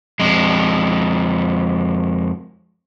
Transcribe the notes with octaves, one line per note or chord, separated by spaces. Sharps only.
F2 G#3